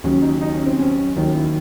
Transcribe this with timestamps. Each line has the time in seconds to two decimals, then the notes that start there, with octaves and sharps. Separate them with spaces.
0.04 D#2 C#3 F#3 C#4
0.22 D#4
0.41 D#4
0.54 C#4
0.66 C4
0.79 C#4
1.16 D#2 D#3 F#3 D#4
1.35 E4